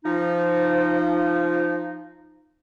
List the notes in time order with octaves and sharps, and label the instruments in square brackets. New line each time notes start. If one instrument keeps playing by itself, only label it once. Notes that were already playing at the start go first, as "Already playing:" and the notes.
[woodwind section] F3 D#4